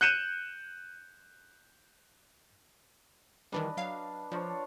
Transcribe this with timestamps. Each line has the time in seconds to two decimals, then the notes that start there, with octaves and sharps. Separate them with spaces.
0.01 F#6 G6 C#7 D#7 E7
3.52 D#3 E3 G3 D4 B4 D#5
3.77 F#3 F5
4.32 F3 D4 F4 C#5